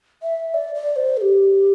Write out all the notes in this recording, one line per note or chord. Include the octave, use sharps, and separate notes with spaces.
E5
D5
D5
C5
A4
G4